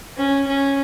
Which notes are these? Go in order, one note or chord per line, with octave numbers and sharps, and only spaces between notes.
C#4
C#4